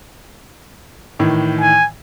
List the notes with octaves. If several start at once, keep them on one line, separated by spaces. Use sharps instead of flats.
A2 D#3 E3
G#5